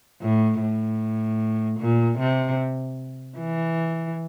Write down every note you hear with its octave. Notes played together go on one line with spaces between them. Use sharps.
A2
A2
A#2
C3
E3